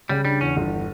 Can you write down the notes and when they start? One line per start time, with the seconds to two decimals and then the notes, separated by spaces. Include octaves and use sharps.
0.09 C#3 G3
0.25 G3 D4
0.41 E2 C#4
0.57 G1